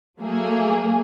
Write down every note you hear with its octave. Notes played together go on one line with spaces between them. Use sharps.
F#3 A3 A#3 G#4